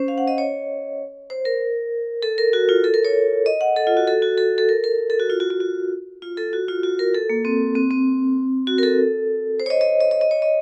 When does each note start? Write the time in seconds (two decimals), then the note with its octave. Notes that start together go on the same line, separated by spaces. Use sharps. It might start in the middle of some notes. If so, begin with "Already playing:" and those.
Already playing: C#4 C5
0.08 F5
0.18 F#5
0.28 D#5
0.38 C#5
1.30 C5
1.45 A#4
2.22 A4
2.38 A#4
2.53 F#4
2.69 F4
2.84 A4
2.94 A#4
3.04 C#5
3.46 D#5
3.61 F#5
3.76 A4
3.87 F4
3.97 F#4
4.08 A4
4.22 F#4
4.38 A4
4.58 A4
4.69 A#4
4.84 A#4
5.10 A4
5.20 F#4
5.30 F4
5.40 F#4
5.50 F#4
5.60 F#4
6.22 F4
6.37 A4
6.53 F#4
6.68 F4
6.83 F#4
6.99 A#4
7.15 A4
7.30 A#3
7.45 C4
7.75 C4
7.91 C4
8.67 F#4
8.78 A#4
8.83 A4
9.60 C5
9.66 C#5
9.70 D#5
9.81 D#5
10.01 D#5
10.11 D#5
10.21 D#5
10.31 C#5
10.42 D#5